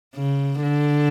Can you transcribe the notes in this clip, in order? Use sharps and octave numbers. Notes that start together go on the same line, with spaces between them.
C#3
D3